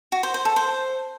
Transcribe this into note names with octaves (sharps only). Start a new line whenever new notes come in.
F#4
C5
C5
A4
C5